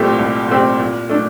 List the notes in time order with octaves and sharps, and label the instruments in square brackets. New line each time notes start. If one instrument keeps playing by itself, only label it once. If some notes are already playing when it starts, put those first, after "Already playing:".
Already playing: [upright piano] C2 A#2 A3 C4 G4
C2
A#2 A3 C4 G4
A#2
A3 D4